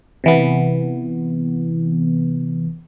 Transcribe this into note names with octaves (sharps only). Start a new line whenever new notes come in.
C3 E3 B3